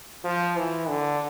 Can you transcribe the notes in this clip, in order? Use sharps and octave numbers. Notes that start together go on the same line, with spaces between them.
F3
E3
D3